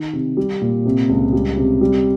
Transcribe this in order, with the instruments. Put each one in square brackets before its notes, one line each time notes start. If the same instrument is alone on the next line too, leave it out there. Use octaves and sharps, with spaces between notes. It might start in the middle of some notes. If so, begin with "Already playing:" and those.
Already playing: [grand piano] D#3
C3
G3
A#2
C3
C#2
G3
C3
G3